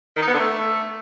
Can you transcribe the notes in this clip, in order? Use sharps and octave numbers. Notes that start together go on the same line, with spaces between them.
D#3
D#4
B3
D3
A3